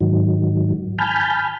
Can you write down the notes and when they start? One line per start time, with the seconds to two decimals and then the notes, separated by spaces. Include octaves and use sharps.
0.01 G#2 D#3 F#3
0.98 G#5 A5 B5 F6 G6